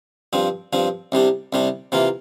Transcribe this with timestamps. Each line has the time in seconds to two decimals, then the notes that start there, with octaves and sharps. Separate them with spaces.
0.33 G2 F3 C4
0.73 G2 F3 C4
1.12 C2 C3 G3 D4
1.53 C2 C3 G3 D4
1.92 C3 E3 A#3 F4